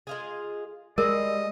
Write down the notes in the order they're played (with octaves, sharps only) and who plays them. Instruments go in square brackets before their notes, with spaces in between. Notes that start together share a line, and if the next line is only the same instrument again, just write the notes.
[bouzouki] G#3 F4 G#4
[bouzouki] G3 [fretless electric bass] G#3 [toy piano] A#4 [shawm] D#5